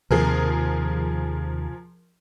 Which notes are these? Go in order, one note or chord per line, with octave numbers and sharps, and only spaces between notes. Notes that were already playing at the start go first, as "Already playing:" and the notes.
D#2 C3 F3 G#4 A#4